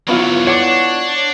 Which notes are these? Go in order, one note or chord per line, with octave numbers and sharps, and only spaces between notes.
D3 F#3 B3 E4 F4
D4 C#5 F#5 D6